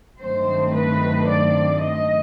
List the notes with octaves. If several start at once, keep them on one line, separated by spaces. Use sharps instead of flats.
G2 D#3 F#3 A3 C4 C5
B4
D5
D#5